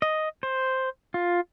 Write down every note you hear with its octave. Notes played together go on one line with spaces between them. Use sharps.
D#5
C5
F4